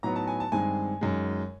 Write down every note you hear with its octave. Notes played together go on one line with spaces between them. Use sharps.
A2 F#3 B3 D#4 A#5
A5
G#5
A5
G2 D#3 G#3 C4 G#5
F#2 D#3 G#3